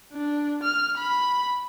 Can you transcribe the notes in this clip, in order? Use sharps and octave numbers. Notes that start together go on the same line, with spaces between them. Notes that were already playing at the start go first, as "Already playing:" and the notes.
D4
F6
B5